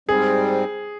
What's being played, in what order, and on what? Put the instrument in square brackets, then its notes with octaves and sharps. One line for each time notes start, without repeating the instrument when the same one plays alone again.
[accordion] G#2 G3 C4 [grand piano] G#4